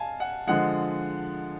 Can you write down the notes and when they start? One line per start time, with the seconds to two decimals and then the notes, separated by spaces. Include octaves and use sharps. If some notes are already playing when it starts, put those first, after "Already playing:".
Already playing: F5 G#5 A5
0.20 F#5
0.47 D3 F3 G#3 F#5